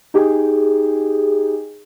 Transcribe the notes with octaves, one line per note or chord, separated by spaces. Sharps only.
D#4 G4 G#4